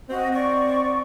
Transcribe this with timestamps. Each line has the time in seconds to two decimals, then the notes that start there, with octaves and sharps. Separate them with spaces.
0.09 C4 F#4 D#5
0.33 D5 C#6